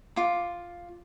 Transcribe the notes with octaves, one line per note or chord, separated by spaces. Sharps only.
F4 D6